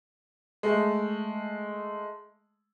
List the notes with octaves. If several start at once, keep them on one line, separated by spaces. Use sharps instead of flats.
G#3 A3